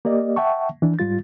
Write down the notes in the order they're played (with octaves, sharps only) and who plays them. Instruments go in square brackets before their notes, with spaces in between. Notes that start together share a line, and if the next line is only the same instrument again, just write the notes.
[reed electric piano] A#3 G4 D5 D#5
E5 F#5 G5 A5 C#6
E3 D4
G#2 G3 F4 A6